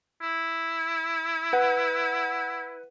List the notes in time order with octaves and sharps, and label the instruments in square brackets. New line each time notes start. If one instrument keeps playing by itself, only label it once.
[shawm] E4
[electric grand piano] B4 F#5